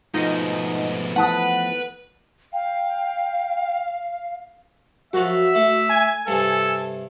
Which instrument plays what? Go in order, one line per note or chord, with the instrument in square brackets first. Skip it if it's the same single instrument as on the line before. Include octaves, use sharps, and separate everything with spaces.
[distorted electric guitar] G#2 B2 [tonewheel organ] F3 A3 B3 [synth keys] D#4 [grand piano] F4
[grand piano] E3 A5 D#6 [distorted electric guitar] B4 [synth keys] F#5
[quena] F5 [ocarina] G5
[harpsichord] F#2 F3 [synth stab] F#4 [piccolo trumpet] E5
[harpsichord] A3 E4
[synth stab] G#5 G#6
[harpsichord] G2 C3 [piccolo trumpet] A4